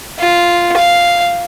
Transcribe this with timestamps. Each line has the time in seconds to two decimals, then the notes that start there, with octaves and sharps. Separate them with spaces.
0.20 F4
0.77 F5